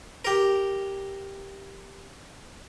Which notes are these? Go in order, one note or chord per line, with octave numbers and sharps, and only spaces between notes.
G4 A#4